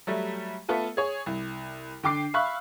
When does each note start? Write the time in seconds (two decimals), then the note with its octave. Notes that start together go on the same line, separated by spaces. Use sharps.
0.07 F#3 G3 A3
0.69 A3 B3 F4 A4 B4
0.97 G#4 C#5
1.26 C2
2.03 D3 G5 D6 C7
2.34 E5 F5 B5 C#6 F#6